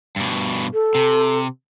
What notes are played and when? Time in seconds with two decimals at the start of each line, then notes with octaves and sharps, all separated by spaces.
0.16 G2 B2
0.74 A4
0.95 C3